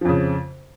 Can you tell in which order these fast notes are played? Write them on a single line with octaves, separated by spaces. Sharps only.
F3 F2 C#3